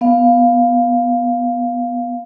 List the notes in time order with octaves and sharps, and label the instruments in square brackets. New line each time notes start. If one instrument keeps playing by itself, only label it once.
[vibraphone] B3 F5